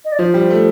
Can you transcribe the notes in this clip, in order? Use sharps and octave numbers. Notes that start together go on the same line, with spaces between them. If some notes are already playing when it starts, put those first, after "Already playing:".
D#5
D5
F3 C5
G3
A3